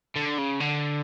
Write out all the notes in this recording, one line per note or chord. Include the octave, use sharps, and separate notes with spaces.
D3
C#3
D3